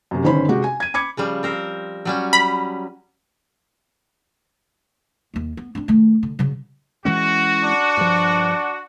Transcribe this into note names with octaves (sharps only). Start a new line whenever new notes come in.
F#2 C3
G1 D#3 C#4 C5 B5
C3 G#3 F#4 G4
G#5
G#6 D#7
B5 D6 G#6 C#7
C#3 F3 G3
C4 A#4 C5
F#3 G3 C#4
A#5 B5
D#2 A#3
B3
C4 D4
D#3 A3
D3
C#3 F#3
E3 G#3 C#4 F#4
D4
G2 F3